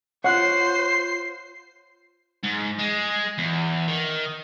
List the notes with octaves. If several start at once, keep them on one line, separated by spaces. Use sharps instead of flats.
F4 C5 C#5 F#5 F#6 C7
G#2
G#3
E2
D#3